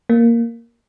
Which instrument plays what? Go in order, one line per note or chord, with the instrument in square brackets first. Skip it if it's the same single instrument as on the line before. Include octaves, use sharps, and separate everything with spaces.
[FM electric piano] A#3